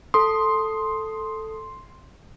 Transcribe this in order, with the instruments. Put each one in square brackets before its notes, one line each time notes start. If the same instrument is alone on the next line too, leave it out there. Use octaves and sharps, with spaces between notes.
[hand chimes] A4 D#6 [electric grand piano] C6